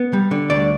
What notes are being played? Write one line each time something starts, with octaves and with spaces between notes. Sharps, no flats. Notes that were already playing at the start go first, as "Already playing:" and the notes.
Already playing: B3
G3
D3
D2 D5